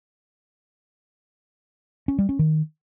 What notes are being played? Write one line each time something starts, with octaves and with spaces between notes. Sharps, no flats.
C#4
G3
C#4
D#3